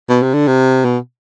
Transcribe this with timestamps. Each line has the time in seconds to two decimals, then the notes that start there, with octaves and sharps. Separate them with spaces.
0.09 B2
0.23 C3
0.34 D3
0.48 C3
0.85 B2